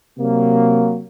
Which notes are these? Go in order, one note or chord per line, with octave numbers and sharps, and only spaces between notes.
C3 F#3 A#3